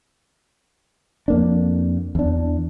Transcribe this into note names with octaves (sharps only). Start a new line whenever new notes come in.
F2 A#3 D4
E2 D4